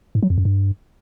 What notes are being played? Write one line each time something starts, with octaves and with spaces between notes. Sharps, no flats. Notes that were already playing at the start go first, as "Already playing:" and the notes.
G#2
F#3
F2
F#2
G2